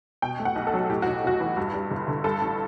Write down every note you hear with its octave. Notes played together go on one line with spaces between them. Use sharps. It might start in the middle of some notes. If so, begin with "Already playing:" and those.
B2 G5
A3
F#5
B1
A4
F#3
A2 G4
B1 F#4
B1 F#4
E3
G2
G3
G1
D3
G2 A4
A1